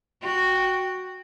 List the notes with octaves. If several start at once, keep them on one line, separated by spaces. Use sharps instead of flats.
F#4 G5